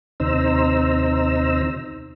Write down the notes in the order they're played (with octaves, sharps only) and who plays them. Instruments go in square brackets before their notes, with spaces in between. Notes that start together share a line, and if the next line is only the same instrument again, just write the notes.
[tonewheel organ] D#2 C3 D#4 C5 A#5 E6